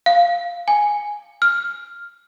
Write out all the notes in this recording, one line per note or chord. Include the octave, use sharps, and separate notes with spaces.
F5
G#5
F6